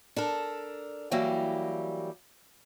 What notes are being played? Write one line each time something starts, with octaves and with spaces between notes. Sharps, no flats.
D4 A4 A#4
E3 F#3 G3 A#3 G4